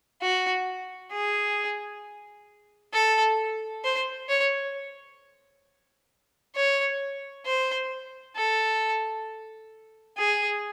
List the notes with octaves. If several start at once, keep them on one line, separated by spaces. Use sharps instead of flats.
F#4
G#4
A4
C5
C#5
C#5
C5
A4
G#4